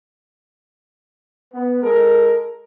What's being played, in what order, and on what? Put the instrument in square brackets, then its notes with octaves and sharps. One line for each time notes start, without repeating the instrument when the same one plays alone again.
[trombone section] B3
G#3 A4 A#4